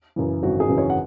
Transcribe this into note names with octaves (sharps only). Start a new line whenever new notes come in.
F#2 C#3 E3
G#1 F#4
G#4
F#2 C#3 E3
C#5
F#5